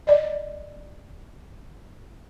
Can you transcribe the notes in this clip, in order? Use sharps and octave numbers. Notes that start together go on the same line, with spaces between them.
D5 D#5